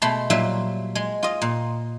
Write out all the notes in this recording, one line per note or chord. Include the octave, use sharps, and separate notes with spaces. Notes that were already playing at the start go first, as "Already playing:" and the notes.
B2 G#3 A3 A5 B5 C6
A#2 F#3 G3 F4 E5
G#3
F4 D#5
A#2